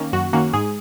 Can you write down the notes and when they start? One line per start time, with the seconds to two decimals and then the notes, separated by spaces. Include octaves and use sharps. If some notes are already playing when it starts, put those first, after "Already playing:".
Already playing: D#3 A#3 C#4
0.13 F#2 F#4
0.33 D#3 A#3 C#4 F#4
0.53 G#2 G#4